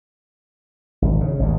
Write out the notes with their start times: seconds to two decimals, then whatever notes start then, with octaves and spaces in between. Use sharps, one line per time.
1.02 G#1
1.21 C#3
1.39 G#1 D2